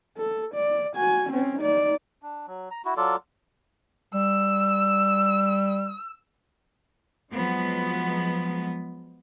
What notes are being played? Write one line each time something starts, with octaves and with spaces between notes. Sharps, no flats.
A4
D5
F#4 G#5
C4 C#4
D#4 D5
D4
F#3
A#5
E4 F#4
F#3 F4 A4 D5
G3 E6
F3 F#3 G#3 B3